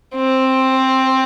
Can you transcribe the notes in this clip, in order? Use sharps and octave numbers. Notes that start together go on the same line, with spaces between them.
C4